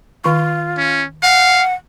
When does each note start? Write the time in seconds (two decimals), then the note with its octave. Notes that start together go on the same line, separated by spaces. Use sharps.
0.24 D#3 F4 C#6
0.77 C#4
1.23 F5 F#5